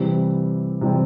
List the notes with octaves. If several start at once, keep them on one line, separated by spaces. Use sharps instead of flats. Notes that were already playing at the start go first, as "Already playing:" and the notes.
Already playing: C3 E3 G3 C4
C3 E3 G3 C4